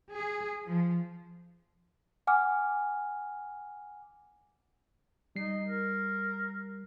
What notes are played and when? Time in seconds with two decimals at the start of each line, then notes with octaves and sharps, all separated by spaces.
0.14 G#4
0.65 F3
2.27 F#5 G#5 D6 F6
5.36 G3 D#4 C7
5.68 A#4